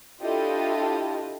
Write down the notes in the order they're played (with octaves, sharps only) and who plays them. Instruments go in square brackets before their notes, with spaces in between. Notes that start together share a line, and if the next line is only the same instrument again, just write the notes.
[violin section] D4 E4 F4 G4 A4 D#5